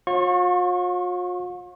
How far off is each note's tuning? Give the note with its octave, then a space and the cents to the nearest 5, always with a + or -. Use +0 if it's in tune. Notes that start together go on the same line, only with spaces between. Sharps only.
F4 +45 C#5 -35 C#6 -25